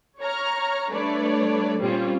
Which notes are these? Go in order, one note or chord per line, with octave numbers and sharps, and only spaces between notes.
C#5 A#5 C#6 F6
G3 A3 D4 B4 C#5 D5
A#2 G3 C4 C#4 F4